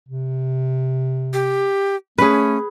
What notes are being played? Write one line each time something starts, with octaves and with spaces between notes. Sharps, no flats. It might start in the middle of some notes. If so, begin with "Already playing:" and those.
C3
G4
A3 C#4 G#4 B4